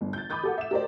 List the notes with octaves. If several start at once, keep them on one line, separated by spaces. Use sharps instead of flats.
G1
G6 A6
B5 D6 D#6 G6 A6
G4 A4 F#5
E5 E7
G4 A#4 C5 D5